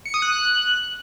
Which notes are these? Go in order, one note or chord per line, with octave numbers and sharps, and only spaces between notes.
C#7
D#6
F#6